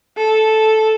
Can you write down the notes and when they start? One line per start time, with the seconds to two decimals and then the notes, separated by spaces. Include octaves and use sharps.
0.17 A4